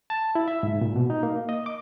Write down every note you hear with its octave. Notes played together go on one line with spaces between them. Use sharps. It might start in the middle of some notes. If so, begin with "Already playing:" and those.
A5
E4
E5
G#2
A#2
B2
D#4
A#3
D#5
D6